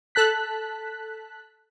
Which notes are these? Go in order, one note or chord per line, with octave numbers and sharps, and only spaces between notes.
A4 A5 F#6 B6